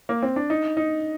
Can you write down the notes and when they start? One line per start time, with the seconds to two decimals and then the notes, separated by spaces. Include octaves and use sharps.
0.09 A#3
0.22 C4
0.36 D4
0.50 D#4
0.77 D#4